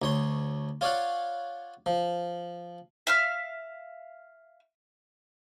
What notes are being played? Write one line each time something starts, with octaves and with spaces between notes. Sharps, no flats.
D2 C#5 C6
F4 C#5 D5 F5 F#5
F3
E5 F5 F6